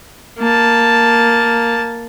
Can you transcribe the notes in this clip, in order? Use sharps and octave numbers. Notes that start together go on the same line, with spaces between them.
A#3 A5